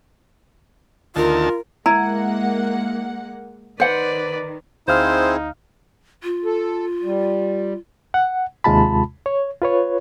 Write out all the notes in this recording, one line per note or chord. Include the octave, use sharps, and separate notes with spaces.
D2 D#3 F4 A#4 A5
G#3 A#3 E4 F#5 A#5
D#3 B4 C5 D5 F#5
D2 C4 D#4 E4 G#4 C5 F5 F6
F4
A4
G3
F#5
D#2 C3 G#3 F4 A5 B5
C#5
F4 B4 C#5